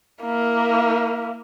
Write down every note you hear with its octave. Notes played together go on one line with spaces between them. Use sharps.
A#3 E4